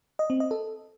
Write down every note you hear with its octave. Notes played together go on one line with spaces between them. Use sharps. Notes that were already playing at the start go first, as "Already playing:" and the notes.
D#5
C4
D#5
A4